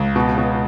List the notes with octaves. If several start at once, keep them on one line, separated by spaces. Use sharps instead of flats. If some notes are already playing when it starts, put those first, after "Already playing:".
Already playing: C#2
B2
B2